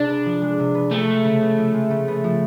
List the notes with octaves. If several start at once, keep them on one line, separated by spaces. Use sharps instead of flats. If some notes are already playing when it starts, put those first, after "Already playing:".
Already playing: C3 G#3 D4
B3
F3
G#3
C3
B3
F3 A3
G#3
C#3
B3
F3
G#3
C#3
B3
F3